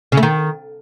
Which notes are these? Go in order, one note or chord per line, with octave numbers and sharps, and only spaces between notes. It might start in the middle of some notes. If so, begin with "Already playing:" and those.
C#3
A3
D#3